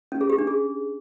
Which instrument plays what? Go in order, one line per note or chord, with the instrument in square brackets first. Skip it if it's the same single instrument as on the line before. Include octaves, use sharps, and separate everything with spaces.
[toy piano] C#4
G#4
G4
D4
G#4